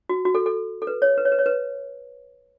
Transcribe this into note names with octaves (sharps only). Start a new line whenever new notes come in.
F#4
F#4
A4
A4
A4
B4
C#5
B4
C#5
B4
C#5
B4